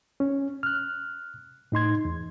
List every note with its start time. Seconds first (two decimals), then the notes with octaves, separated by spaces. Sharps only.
0.20 C#4
0.63 F6 F#6
1.72 A2 D#4 C6 G#6
2.05 E2